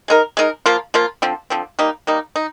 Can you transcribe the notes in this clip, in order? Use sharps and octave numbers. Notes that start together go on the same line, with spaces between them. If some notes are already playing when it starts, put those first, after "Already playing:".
G#3 D#4 A#4
G#3 D#4 A#4
F3 A#3 F4
F3 A#3 F4
D3 F3 C4
D3 F3 C4
G3 A#3 D#4
G3 A#3 D#4
D#4